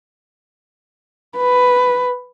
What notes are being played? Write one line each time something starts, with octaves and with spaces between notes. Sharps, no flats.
B4